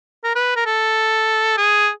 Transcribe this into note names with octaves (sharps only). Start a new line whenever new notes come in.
A#4
B4
A#4
A4
G#4